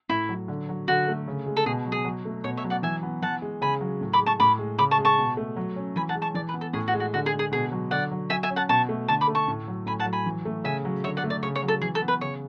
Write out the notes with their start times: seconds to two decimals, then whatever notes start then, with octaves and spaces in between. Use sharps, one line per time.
0.09 A2 E4
0.29 F#3
0.48 D3
0.69 F#3
0.88 D3 F#4
1.08 A3
1.28 C#3
1.46 G#3
1.57 A4
1.66 B2 G#4
1.86 F#3
1.92 G#4
2.05 F#3
2.25 A3
2.44 B2 C#5
2.57 C#5 E5
2.64 F#3
2.70 D5 F#5
2.83 E3 E5 G#5
3.03 B3
3.22 E3 F#5 A5
3.42 G#3
3.61 C#3 G#5 B5
3.81 F#3
4.01 A2
4.13 B5 D6
4.20 G#3
4.26 A5 C#6
4.40 A2 B5 D6
4.59 G#3
4.78 C#3 B5 D6
4.91 A5 C#6
4.98 G#3
5.05 A5 C#6
5.18 B2
5.37 A3
5.57 F#3
5.76 C#4
5.96 E3 G#5 B5
6.09 F#5 A5
6.15 G#3
6.22 A5 C#6
6.34 E3 D5
6.49 B4
6.54 B3
6.61 A4
6.73 A2 G#4
6.88 F#4
6.94 G#3
7.00 F#4
7.14 D3 F#4
7.26 G#4
7.33 G#3
7.39 G#4
7.52 B2 G#4
7.72 F#3
7.91 D3 D5 F#5
8.11 F#3
8.30 F#3 E5 G#5
8.43 E5 G#5
8.50 C#4
8.56 F#5 A5
8.69 B2 A5 C#6
8.89 A3
9.08 D3 A5 C#6
9.21 B5 D6
9.28 A3
9.35 A5 C#6
9.48 A2
9.68 F#3
9.86 A2 G#5 B5
9.99 F#5 A5
10.06 F#3
10.13 G#5 B5
10.26 E3
10.45 A3
10.64 C#3 E5 G#5
10.85 F#3
11.04 D3 C#5 E5
11.17 D5 F#5
11.24 A3
11.30 D5
11.43 C#3 C#5
11.56 C#5
11.63 F#3
11.68 A4
11.81 E3 G#4
11.95 A4
12.02 B3
12.08 B4
12.21 C#3 C#5